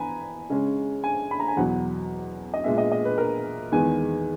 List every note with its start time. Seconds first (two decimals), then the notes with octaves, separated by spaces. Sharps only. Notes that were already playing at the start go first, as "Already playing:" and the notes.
Already playing: E3 B3 G#5 A#5 B5
0.50 C#3 G#3 C#4
1.04 G#5
1.31 B5
1.40 A#5
1.48 G#5
1.57 E2 B2 F#3 F#5
2.54 D#5
2.64 A#2 G#3 B3 E5
2.78 D#5
2.92 D#5
3.05 B4
3.18 A#4
3.72 E2 D#3 G#3 B3 G#5